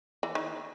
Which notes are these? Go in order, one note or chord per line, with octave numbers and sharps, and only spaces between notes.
E3
D#3